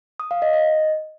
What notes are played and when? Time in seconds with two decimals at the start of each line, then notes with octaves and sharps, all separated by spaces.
0.20 D#6
0.31 F5
0.42 D#5
0.53 D#5